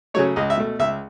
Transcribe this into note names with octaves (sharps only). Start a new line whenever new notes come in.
C#3 F#3 A3 C#5
C#2 D#5
E5
B2 A3
C#2 E5